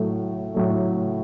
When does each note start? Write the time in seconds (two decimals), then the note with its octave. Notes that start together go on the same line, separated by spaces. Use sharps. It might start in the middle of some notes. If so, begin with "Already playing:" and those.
Already playing: A2 F#3 A3
0.54 A2 F#3 A3